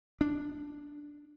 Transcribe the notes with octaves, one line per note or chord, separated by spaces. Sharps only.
D4